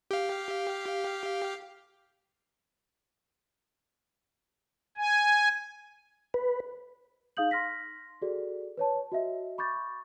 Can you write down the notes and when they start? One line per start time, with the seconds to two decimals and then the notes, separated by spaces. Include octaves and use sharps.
0.11 G4 F5
4.97 G#5
6.34 B4
7.37 D#4 G#4 F5 D#6 G6 F#7
7.51 C6 F6 A#6 B6
8.22 F#4 G#4 A4 D5
8.77 B4 C#5 A5
9.12 F#4 D#5 E5
9.58 B5 C#6 D6 G6 A6